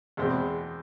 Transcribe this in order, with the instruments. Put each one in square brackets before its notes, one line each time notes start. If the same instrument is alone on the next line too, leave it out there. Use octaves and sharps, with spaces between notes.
[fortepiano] E2 B2 G#3 C4